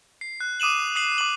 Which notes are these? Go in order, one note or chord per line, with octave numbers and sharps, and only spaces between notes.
C7
F#6
D6 D#6 D#7 E7 F#7
D#6 C7 F#7
D6 F#7